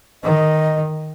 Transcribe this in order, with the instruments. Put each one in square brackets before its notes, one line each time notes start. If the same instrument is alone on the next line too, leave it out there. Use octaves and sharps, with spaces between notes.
[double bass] D#3 [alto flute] D#5